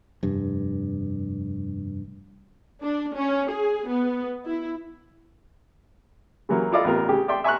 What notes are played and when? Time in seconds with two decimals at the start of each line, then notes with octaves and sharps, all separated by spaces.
0.23 F1 G2
2.82 D4
3.15 C#4
3.51 G#4
3.89 B3
4.46 E4
6.49 C#3 E3 F#3 A#3
6.72 E4 F4 A4 D5 D#5 F5
6.84 A1 B3 F4 A#4
7.09 C#3 G4 G#4
7.28 D5 E5 G5 C6
7.44 E5 G#5 A#5 C#6 F6 F#6